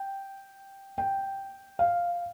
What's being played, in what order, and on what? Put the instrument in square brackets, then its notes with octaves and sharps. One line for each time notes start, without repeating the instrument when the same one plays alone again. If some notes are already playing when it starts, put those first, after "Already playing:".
Already playing: [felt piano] G5
G5
F5